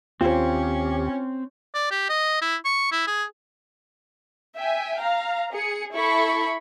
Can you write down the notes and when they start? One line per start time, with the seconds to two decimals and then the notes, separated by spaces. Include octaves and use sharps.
0.21 D#2 C4 C#4 F4 G4 C5
1.75 D5
1.91 G4
2.09 D#5
2.42 E4
2.65 C#6
2.92 E4
3.07 G#4
4.56 E5 G5 G#5
5.00 F5 A#5
5.52 G#4 C#7
5.94 E4 A4 B5 C#6